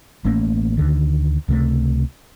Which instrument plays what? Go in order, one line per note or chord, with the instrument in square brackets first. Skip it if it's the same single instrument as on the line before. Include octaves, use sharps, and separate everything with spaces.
[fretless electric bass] A1 A3 A#3 C#4
D2 D3 D#3
C#2 C3 G3 A3